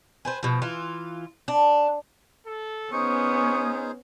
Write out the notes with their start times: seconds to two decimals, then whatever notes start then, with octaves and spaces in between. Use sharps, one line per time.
0.25 G#4 B4 C5
0.43 B2 F3
0.62 E3 F4
1.48 D4
2.47 A4
2.93 B3 C#4 D#4 G#4 C5 C#6 D#6